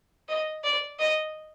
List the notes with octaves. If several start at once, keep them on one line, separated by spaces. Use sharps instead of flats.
D#5
D5
D#5